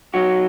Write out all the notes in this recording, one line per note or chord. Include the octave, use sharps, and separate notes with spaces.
F#3 D#4 F#4